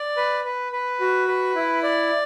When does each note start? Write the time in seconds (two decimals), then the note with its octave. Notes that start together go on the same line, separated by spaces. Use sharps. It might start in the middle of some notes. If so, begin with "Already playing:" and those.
Already playing: D5
0.17 B4
0.45 B4
0.72 B4
1.00 F#4
1.28 B4
1.55 E4
1.83 D5